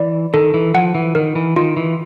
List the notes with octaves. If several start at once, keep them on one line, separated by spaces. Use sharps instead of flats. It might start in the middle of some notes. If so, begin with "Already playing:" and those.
Already playing: E3 D5
D#3 A4
E3
F3 F#5
E3
D#3 A#4
E3
D#3 F4
E3